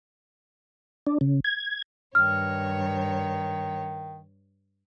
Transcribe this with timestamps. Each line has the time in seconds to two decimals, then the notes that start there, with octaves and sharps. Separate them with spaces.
1.07 D4
1.21 C#3
1.44 G#6
2.15 G2 D#3 C#5 F6